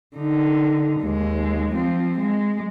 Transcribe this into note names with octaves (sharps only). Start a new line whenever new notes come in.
D3 D#4
D#2 G#3
F3 C4
G#3